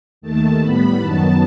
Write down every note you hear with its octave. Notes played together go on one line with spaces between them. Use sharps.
D#2 D#3 A3 A5
A2 G3 B3 B5
F#2 D#3 F#3 B3 A5